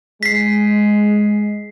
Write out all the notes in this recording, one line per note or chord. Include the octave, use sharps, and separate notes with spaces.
G#3 B6 C7